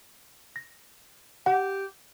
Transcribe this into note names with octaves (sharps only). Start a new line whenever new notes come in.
A#6
G4 F#5